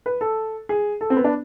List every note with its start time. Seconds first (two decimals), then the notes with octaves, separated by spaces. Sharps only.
0.06 B4
0.21 A4
0.69 G#4
1.01 A4
1.10 C4
1.16 B3
1.24 D4